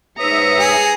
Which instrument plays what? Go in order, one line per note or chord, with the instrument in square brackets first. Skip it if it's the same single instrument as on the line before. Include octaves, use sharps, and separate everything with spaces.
[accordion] G#2 E5 D#6 [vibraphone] B4 C#5 [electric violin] A#5 C#7
[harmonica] G#4